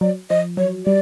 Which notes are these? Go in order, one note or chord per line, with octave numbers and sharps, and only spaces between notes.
F#3 D5
F3 D#5
F#3 C#5
G3 D5